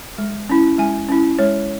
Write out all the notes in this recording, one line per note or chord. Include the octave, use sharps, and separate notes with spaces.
G#3
C#4 E4
G#3 G#5
C#4 E4
G#3 C#5